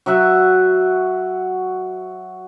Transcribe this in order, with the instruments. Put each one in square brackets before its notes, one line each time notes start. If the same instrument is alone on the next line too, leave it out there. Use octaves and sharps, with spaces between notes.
[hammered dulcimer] F#3 F#4 E5 F#5